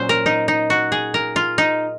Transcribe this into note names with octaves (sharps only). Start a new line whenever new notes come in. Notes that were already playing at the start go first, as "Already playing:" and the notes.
Already playing: A#2 F#3 C#4 C5
A#4
D#4
D#4
F#4
G#4
A#4
F4
D#4